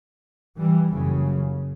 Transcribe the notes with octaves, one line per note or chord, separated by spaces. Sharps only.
E3 G3
F#1 F#2 C#3